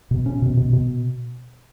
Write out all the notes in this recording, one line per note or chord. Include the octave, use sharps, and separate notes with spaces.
B2
C#4
B2
B2
B2